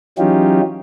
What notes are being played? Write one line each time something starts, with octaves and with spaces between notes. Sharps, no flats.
E3 F#3 C#4 D#4 F4 G4